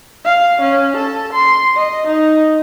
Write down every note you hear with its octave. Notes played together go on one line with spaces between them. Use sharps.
F5
C#4
A4
C6
D#5
D#4